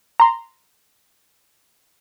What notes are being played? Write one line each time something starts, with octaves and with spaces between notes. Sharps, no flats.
A#5 C6